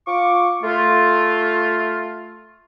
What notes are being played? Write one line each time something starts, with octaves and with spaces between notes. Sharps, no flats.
F4 C#6 D6
A3 F4